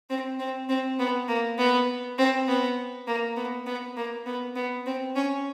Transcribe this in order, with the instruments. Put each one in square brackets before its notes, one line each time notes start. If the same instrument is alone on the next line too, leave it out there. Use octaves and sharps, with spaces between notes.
[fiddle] C4
C4
C4
B3
A#3
B3
C4
B3
A#3
B3
B3
A#3
B3
B3
C4
C#4